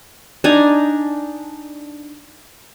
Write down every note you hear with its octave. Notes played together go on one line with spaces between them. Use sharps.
D4 D#4 G#5 A#5